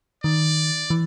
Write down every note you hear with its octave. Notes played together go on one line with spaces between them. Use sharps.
D#3 D5
E3